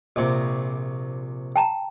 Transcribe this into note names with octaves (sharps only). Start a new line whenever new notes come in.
A#1 C3
G5 A5 A#5